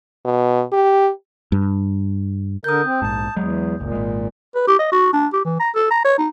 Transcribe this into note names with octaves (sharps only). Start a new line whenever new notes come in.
B2
G4
G2
D3 A#4 D#6 G6
C4
A#1 G#2 A5
E2 F#3 G#3
F#1 C#2 A#2
G#1 G#3
B4
G4
D#5
F#4
D4
G4
E3
A#5
A4
A#5
C#5
D#4